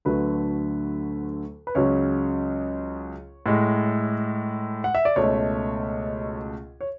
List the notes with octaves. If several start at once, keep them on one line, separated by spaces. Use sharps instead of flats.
D2 D3 F#3 A3 B4
B4
C#2 C#3 F#3 C#5
A2 G#3
F#5
E5
D5
C#2 B2 A3 C#5
C#5